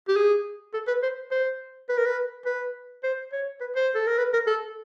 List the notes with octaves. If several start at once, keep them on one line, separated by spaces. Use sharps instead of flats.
G4
G#4
A4
B4
C5
C5
B4
A#4
B4
B4
C5
C#5
B4
C5
A4
A#4
B4
A#4
A4